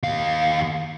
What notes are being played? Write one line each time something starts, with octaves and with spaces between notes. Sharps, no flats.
D#2 F5